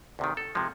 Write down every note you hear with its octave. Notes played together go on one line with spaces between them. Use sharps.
D2 C3 D#3
A4
C3 F3 G#3